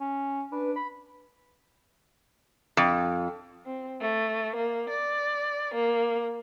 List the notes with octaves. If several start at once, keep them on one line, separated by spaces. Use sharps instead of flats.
C#4
D4 B4
B5
F2
C4
A3
A#3
D5
A#3